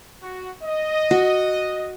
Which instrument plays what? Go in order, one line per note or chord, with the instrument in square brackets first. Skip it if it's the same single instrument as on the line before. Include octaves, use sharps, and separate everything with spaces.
[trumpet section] F#4
D#5
[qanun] F#4